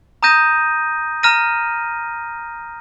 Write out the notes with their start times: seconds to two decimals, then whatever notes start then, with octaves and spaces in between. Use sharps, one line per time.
0.23 A#5 D#6 G6 A#6 D#7
1.23 A#5 F6 A#6 D#7